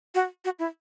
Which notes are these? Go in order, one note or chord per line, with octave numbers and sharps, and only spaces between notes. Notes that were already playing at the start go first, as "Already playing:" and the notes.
F#4
F#4
E4